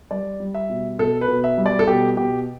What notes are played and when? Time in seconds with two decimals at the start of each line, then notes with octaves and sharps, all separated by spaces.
0.11 G3 D5
0.40 G3
0.54 E5
0.69 B2
0.98 B2 A4
1.21 B4
1.28 B2
1.44 E5
1.58 G3
1.66 D5
1.79 A4
1.87 B2 G4
2.17 B2 G4